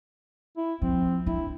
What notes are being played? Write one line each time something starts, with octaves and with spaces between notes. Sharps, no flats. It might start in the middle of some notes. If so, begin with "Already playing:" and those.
E4
F3 C4
D4 E4